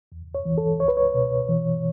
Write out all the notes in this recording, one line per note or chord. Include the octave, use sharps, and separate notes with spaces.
E2
C#5
E3
A4
C#2 C#5
B4
C#5
B2
E3